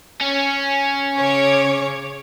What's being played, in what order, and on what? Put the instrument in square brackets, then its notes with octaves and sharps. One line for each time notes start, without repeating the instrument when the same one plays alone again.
[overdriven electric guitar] C#4
[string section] C#3 C#5 D6